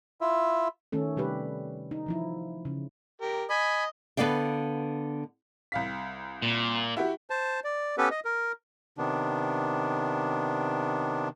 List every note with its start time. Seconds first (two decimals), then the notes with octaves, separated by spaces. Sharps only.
0.21 E4 F4 E5
0.92 D#3 A3 C#4 A4
1.17 C3 G3 G4 B4
1.91 D#4
2.06 E3 F3 E4
2.65 C#3
3.22 G4 A#4
3.50 D#5 G#5 B5
4.17 D3 B3 B4 D5 F5 G5
5.72 C2 F5 B6
6.42 A#2
6.97 E4 F#4 G4
7.30 C5 A5
7.64 D5
7.98 B3 C#4 G4 A4 B4
8.11 D#5
8.25 A#4
8.98 C3 D#3 B3 D4